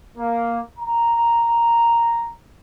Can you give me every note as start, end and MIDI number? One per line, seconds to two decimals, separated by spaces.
0.18 0.59 58
0.79 2.32 82